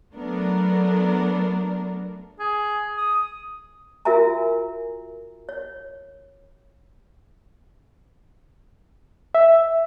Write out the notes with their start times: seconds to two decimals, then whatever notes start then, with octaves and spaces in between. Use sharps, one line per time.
0.15 F#3 A3 B3 D4 A#4
2.40 G#4
2.98 D#6
4.05 F4 F#4 A#4 E5 G#5 A#5
5.49 C#5
9.34 E5